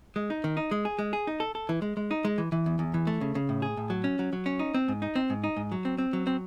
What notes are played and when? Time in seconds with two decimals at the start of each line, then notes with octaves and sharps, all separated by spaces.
0.16 G#3
0.30 D#4
0.44 D#3
0.57 D#4
0.71 G#3
0.85 G#4
0.99 G#3
1.13 G#4
1.27 D#4
1.40 A4
1.55 A4
1.69 E3
1.82 G#3
1.97 G#3
2.11 D#4
2.25 G#3
2.38 E3
2.52 E3
2.66 E2
2.79 E2
2.94 E3
3.07 A3
3.21 C#3
3.35 C#3
3.49 A2
3.62 G#4
3.77 A2
3.90 F#3
4.04 C#4
4.19 F#3
4.33 F#3
4.46 C#4
4.59 D#4
4.74 C4
4.88 G#2
5.02 D#4
5.15 C4
5.30 G#2
5.44 D#4
5.57 G#2
5.72 F#3
5.85 C4
5.98 C4
6.13 F#3
6.27 C4